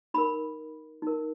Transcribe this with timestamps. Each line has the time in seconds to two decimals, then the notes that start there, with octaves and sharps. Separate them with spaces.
0.14 D#4 A#4 B5
1.02 D#4 A#4